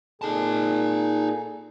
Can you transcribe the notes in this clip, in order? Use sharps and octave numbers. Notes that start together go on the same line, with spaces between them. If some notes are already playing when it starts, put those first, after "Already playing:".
A#2 D#4 G#4 A4 A5